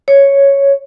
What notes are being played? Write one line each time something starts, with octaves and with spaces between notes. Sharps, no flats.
C#5